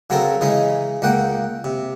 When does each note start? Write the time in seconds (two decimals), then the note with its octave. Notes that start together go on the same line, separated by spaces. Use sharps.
0.10 C#3 F#3 C4 A4 A#4
0.41 C#3 E3 G#3 D#4
1.02 C#2 A#3 F#5 G5
1.64 C3